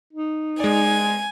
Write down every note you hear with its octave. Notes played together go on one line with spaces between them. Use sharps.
D#4
G#3 D5 G#5